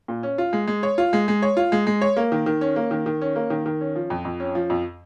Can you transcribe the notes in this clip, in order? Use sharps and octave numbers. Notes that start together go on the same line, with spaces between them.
A#2
C#4
F4
G#3
G#3
C#5
F4
G#3
G#3
C#5
F4
G#3
G#3
C#5
A#3
D#3
D#3
C#4
A#3
D#3
D#3
C#4
A#3
D#3
D#3
C#4
F3
F2
F2
C#4
F3
F2